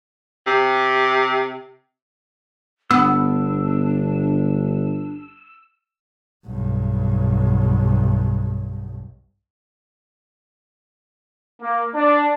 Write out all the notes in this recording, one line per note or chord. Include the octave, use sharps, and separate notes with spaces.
C3
G1 B3 D4 E6
B1 G2
A#3
D4